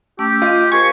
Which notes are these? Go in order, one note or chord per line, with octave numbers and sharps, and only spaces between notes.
A3 C#4 G4 E6
F4 D#5
G4 A#4 C5 G#5 C#6